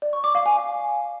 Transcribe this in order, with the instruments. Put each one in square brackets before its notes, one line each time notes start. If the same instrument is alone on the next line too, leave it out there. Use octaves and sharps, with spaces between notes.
[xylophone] D5
C#6
D6
F5
G#5